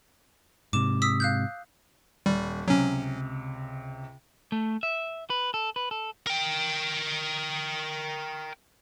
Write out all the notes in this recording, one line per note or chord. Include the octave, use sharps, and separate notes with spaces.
G#2 C3 D6 E7
D#6 E6 B6
F5 F#6 G6
D#1 G3
C#2 C3 F#3 C#4
A3
E5
B4
A4
B4
A4
A#4 G5